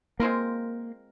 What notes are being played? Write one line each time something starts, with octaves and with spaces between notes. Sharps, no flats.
G#3 A#3 C4 F4 A#4